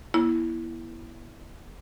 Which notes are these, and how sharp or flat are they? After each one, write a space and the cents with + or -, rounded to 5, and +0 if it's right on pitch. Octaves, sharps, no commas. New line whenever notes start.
B3 -45 E4 +0